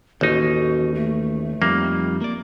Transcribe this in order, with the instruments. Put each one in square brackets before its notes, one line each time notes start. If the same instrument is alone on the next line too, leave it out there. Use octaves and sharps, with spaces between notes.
[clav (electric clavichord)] A1 D#4 [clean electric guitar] D#2 [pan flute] F#4
[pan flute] A3
[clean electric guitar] F2 G3 D#4 [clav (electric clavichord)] A#3
[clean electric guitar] A#3 D5